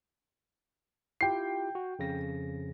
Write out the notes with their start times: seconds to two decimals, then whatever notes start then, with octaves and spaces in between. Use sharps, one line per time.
1.21 E4 F4 G4 G5 C7
1.75 F#4
1.99 F2 C#3 A#6